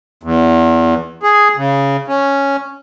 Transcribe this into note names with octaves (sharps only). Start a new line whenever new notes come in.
E2
G#4
C#3
C#4